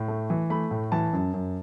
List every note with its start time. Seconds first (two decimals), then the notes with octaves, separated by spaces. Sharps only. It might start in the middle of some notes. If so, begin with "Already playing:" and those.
Already playing: A2
0.08 A3
0.30 E3
0.50 A3 B5
0.71 A2
0.92 E3 A5
1.13 F#2
1.33 F#2